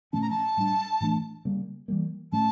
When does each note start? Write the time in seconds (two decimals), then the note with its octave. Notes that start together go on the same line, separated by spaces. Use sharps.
0.13 A#2 F3 A3 C#4 A5
0.22 A#5
0.30 A5
0.57 A2 G3 D4
1.00 A2 E3 A3 D4
1.45 C#3 G3 A#3
1.88 E3 G3 A#3
2.32 A2 F3 A3 C#4 A5